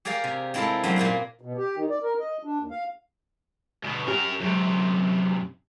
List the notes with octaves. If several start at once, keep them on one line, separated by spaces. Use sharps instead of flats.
G4 G#4 A#4 D5 F5
C3
G#3 C4 E4 F4 A4 A#4
F#2 F#3 G3 A#3 C4 C6
A#2 A#3 F4 G#4
B2
G4
D#3
D5
A#4
D#5
D4
D#2
F5
D2 B2
F#2 C#4 G4 A#4
F#2 C3 F#3 G#3